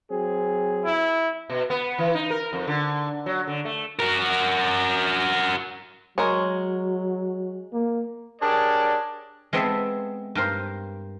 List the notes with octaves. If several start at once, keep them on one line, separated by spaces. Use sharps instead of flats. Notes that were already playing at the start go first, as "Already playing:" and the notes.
F#3 C4 G#4
E4
B2
B3
E3
D#4
A#4
F2
D3
F#3
D3
A3
F#4 A#4
F#3 G#3 A#4 C#5
A#3
D4 G4 G#4 A#4 C#5 D5
G#3 B3 C4 G#4 A4 E5
G2 G4 A#4 C5